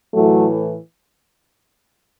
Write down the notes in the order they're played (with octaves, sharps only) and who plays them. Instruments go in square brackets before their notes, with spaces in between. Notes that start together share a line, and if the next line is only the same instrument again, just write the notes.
[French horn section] A2 E3 F#3 A3